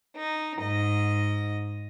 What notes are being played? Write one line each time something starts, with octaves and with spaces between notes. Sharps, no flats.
D#4
G#2 D#5